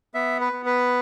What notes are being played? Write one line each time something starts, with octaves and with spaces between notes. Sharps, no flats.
B3 E5
B4
B3
B4